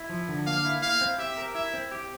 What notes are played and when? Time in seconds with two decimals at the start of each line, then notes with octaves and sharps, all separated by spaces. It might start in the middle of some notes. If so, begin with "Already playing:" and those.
Already playing: E4
0.09 F3
0.28 D3
0.47 A#3 F5
0.65 E4
0.82 E4 F5
1.01 C4
1.19 G4 E5
1.37 A#4
1.55 E4 E5
1.74 C4
1.91 G4